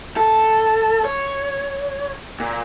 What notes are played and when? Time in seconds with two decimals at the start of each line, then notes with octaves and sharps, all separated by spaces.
0.17 A4
1.05 C#5
2.40 A#2